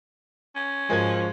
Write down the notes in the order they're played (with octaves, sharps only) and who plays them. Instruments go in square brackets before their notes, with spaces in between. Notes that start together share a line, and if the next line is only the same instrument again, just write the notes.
[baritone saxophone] C#4
[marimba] G#2 A#4 G#5 [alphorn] F3 [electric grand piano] G#3 G#6